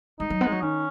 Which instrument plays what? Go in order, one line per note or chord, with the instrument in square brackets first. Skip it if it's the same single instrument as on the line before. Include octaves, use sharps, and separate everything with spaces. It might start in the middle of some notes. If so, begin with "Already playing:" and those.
[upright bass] G#3 [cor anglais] D#4
[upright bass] F#3
B3
G#3
F#3
[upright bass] D#3 [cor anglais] C#4